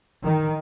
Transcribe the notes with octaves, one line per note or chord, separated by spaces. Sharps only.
D#3